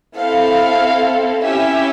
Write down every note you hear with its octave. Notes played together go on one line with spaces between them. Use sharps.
C4 E4 A4 F5
C#4 E4 G4 E5